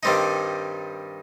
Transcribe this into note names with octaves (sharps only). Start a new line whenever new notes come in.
G2 D#3 G3 C4 D#4